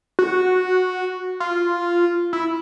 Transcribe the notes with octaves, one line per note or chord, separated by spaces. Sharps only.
F#4
F4
E4